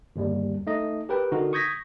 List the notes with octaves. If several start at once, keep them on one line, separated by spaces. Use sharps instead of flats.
G1 D#2 G3
A3 D#4 D#5
G4 A#4 B4 G5
D3 D#4 F#4 A#4
C#6 D#6 G6 G#6 A#6 B6